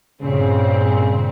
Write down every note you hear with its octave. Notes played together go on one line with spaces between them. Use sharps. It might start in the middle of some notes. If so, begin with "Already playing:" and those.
G2 A#2 C#3 C4